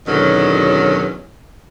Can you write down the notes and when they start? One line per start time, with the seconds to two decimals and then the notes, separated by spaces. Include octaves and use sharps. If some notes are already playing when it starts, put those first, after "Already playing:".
0.07 E2 B2 D3 D#3 F#3 C#4